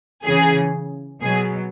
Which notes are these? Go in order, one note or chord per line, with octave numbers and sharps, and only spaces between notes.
C#3 E3 G#4
B2 F#3 G#4